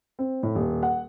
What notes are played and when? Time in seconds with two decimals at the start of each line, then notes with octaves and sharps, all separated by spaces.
0.19 C4
0.43 A2
0.55 D#1
0.83 F#5